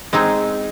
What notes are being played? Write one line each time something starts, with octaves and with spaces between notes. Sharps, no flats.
G#3 C4 D#4 G#4